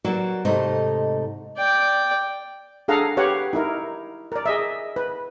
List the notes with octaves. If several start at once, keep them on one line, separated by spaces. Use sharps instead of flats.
F#3 A#3 F#4 D5
G#2 C3 A3 D#4 D#5
D5 G5
D4 G#4 A4 F5 F#5 A#5
G4 B4 C#5 F5 F#5
D#4 E4 A#4
A#4 D5
G#4 D#5 E5
B4